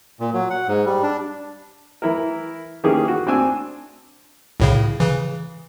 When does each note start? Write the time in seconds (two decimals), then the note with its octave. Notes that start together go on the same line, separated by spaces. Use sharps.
0.20 A#2
0.34 F#3
0.50 F#5
0.68 G#2
0.86 G3
1.03 D4
2.02 E3 E4 A#4
2.84 D#3 E3 A#3 C#4 G4 G#4
3.08 F#4
3.27 C4 D4 G#5 E6
4.60 C2 A2 C#3
5.00 C#3 E3